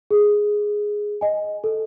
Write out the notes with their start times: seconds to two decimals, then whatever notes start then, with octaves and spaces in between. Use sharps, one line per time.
0.11 G#4
1.21 D#5 G#5
1.64 A4